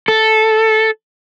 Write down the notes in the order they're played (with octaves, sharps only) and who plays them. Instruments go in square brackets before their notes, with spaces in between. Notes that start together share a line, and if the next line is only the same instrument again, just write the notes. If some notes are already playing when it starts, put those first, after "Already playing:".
[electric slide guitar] A4